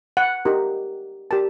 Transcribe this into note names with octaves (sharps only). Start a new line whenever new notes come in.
F#5
D#4 G4 A#4
G4 A#4 A5